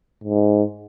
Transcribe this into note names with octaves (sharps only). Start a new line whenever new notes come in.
G#2